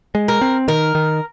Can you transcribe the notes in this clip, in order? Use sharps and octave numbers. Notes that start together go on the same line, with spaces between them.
G#3
A#4
C4
D#3 A#4
D#3